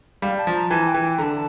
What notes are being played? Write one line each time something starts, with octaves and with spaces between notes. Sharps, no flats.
G3 F5
A5
F3
A#5
E3 A5
G5
E3
G5
D3 A5 A#5